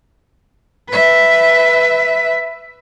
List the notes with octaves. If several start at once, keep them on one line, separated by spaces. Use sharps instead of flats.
B4 E5